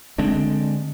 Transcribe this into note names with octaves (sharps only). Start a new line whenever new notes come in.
D3 G#3 C4 D4